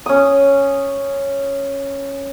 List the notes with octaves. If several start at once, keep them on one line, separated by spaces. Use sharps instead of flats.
C#4 D#6